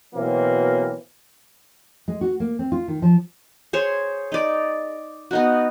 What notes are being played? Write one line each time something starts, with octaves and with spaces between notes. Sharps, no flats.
B2 E3 F#3 A#3 C4
G#3
F#4
A#3
C4
F4
D#3
F3
G#4 C5 C#5
D#4 D5
B3 D#4 F#4